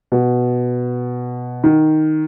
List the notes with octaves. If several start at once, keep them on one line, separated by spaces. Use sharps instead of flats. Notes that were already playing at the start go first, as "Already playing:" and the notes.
B2
D#3